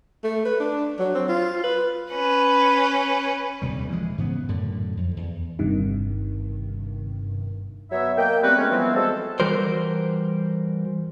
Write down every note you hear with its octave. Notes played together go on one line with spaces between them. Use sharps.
A3
B4
D4
F#3
C4
F4
B4
C#4 B4
D#1 D2 C3 G3
E3 F3 G#3
G#2 C#3 B3
F#2 A2 D3
F2
E2
G1 G2 C3 D#3
F#3 B3 C#5 E5
A#3 A#4 D#5 G5
G3 A3 B3 C4 F#4 B4
F#3 G#3 A3 C#4
E3 F3 G3 B3 C4
G#3 C4 F#4 G#4 A4
E3 G3 F#4 A#4 C5